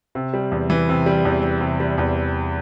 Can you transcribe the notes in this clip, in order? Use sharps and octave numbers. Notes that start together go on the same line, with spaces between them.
C3
G3
E2
E3
C3
G3
E2
E3
C3
G3
E2